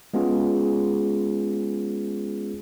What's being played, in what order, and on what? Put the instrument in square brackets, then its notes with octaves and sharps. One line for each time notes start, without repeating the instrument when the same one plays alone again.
[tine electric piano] G#3 B3 C#4 F4 G#4